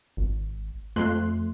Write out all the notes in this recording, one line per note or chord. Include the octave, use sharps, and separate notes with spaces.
G#1
F2 A3 C6 F#6